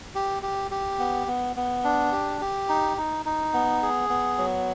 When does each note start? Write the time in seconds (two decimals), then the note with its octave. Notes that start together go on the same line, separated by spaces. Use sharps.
0.15 G4
0.43 G4
0.71 G4
0.99 B3
1.27 B3
1.56 B3
1.84 D4
2.12 G4
2.41 G4
2.69 D#4
2.97 D#4
3.26 D#4
3.54 B3
3.82 G#4
4.10 B3
4.38 F#3